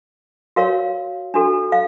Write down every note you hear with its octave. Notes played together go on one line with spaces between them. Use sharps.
F#4 A#4 C#5 F5
D4 F#4 A4
F5